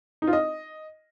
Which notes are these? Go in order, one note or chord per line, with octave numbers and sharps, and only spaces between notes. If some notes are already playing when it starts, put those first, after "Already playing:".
D#4
F4
D#5